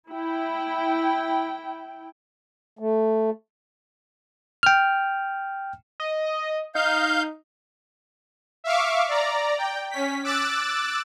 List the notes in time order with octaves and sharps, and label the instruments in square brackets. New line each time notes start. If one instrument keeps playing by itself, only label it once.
[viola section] E4 G5
[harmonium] A3
[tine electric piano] G5 F6
[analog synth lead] D#5
[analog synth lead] D#4 [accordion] F5 G6
[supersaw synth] E5 F5 C#6 D6
D5 A#5
G5
C#4 B6
D6 E6 F#6 A6